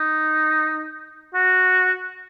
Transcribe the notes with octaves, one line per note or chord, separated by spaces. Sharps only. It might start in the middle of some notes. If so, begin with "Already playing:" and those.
Already playing: D#4
F#4